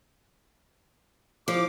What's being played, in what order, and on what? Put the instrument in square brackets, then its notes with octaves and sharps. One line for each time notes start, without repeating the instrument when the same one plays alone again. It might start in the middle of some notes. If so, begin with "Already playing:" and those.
[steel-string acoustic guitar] F3 [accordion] D6